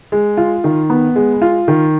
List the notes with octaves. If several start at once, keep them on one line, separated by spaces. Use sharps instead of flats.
G#3
F4
D#3
B3
G#3
F4
D#3